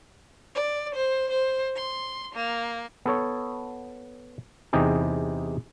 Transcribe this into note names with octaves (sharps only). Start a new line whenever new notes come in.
D5
C5
C5
C6
A#3
B3 A4 C#5
E2 C3 D#4 G4 G#4